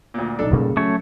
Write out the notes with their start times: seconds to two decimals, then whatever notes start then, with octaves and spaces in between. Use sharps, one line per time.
0.14 D2 A#2
0.39 D#1 B1 D4 D#4 A4
0.51 G2 A#2 C#3 G3 A#3 A4
0.77 F#3 A3 C#4 C#5